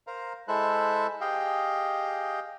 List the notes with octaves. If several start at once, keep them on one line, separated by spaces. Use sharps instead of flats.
A#4 C5 F5 A#5
G#3 E4 A4 C5 E5 F#6
G4 G#4 D#5 F5 G5